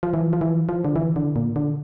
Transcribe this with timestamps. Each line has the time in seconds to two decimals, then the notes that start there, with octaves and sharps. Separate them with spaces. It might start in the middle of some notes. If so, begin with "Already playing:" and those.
0.03 F3
0.14 E3
0.33 F3
0.41 E3
0.69 F3
0.85 D3
0.96 E3
1.16 D3
1.36 A#2
1.56 D3